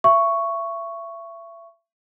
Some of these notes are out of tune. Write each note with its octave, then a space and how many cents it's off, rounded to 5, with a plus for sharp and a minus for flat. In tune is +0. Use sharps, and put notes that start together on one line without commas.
E5 +30 C#6 +0